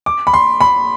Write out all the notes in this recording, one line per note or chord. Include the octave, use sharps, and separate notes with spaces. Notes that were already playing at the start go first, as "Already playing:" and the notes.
D6
B5
C6
B5